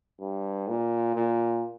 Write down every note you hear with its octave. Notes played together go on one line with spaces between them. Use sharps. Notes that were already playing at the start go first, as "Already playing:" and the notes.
G2
A#2
A#2